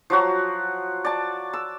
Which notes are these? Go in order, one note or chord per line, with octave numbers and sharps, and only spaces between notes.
F3 F#3 F#4
D5 A5
E6